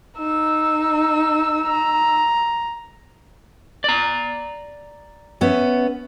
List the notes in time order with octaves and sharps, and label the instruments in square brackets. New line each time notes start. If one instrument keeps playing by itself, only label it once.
[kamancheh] D#4 E6
[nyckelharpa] A#5
[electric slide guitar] D5 A#5
[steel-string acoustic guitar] B3 C#4 E5